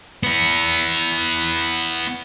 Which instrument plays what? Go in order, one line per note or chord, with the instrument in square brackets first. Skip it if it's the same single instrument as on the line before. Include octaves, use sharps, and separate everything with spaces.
[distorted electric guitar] B3 E4